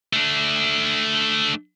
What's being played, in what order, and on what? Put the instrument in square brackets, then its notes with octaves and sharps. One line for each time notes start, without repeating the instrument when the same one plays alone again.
[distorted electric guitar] A3 D4